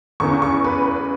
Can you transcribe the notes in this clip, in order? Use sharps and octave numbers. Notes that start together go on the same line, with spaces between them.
E2 C#3 E3 C#6
C#6
B4
B4